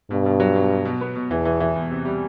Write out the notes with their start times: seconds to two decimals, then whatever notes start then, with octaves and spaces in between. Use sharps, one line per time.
0.11 G2 B2
0.26 B2
0.40 F#3
0.55 B2
0.70 B2
0.85 B2
1.01 B3
1.16 B2
1.30 E2 E3
1.45 E3
1.60 E3
1.76 E2
1.91 C3
2.05 G3